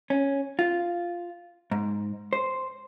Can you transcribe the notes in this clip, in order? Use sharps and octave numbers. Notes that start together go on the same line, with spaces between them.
C#4
F4
G#2
C5